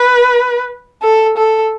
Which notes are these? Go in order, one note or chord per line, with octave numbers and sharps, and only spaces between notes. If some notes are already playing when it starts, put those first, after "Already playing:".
Already playing: B4
A4
A4